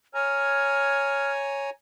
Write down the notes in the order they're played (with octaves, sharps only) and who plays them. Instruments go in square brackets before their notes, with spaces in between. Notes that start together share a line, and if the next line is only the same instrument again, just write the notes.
[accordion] C#5 G#5 A#5 [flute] F6